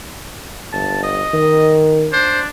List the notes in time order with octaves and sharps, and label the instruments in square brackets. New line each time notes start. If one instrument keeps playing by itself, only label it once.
[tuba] G1 [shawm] A5
[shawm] D#5
[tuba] D#3
[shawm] D4 [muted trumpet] C5